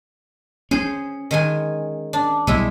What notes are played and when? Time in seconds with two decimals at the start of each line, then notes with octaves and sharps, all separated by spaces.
0.71 C#4 G#4 C5
1.31 D#3 G#3 G#5
2.13 D4
2.47 B1 G3 G#3 E4 E5